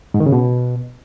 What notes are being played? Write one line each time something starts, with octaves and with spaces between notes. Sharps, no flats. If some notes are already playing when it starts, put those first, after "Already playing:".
G#2
D#3
C#3
B2